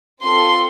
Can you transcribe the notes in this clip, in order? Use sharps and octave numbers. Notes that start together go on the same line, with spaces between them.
C4 F4 A4 C6